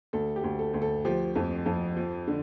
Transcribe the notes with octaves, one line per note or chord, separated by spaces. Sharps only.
D2 A4
G4
D2
A4
D2
A4
F3 G4
F2
F2
F3
D3